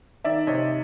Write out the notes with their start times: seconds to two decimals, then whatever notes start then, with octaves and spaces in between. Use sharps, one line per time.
0.24 D#3 D5 E5
0.47 C3 C#5 D#5